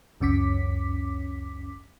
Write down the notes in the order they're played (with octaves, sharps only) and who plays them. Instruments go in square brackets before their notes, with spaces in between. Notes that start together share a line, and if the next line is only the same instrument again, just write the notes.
[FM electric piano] G1 C#2 F#2 C#4 D6 B6